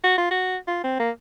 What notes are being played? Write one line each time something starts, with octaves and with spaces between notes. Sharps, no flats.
F#4
F4
F#4
F4
C4
A#3